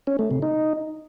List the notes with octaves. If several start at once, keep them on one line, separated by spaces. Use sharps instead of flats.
C#4
A3
C3
D#4